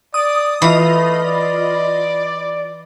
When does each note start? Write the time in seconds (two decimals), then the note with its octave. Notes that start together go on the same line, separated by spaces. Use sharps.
0.14 D5 D#6
0.62 E3 A3 F4 D#5 B5
1.23 D5